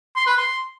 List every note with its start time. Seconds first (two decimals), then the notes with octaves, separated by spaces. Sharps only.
0.16 C6
0.26 B4
0.37 C6